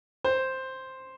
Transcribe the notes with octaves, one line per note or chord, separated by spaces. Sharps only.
C5